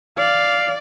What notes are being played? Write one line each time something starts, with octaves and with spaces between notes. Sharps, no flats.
D5 F5